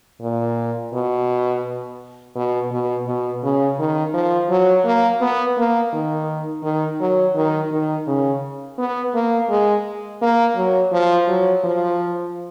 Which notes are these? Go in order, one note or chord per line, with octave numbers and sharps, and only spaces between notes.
A#2
B2
B2
B2
B2
C#3
D#3
F3
F#3
A#3
B3
A#3
D#3
D#3
F#3
D#3
D#3
C#3
B3
A#3
G#3
A#3
F#3
F3
F#3
F3